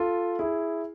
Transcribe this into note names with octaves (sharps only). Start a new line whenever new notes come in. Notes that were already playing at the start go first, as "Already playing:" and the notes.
Already playing: F4 A4
E4 G#4